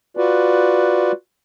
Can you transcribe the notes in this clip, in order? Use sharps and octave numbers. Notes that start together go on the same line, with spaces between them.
F4 F#4 B4 D5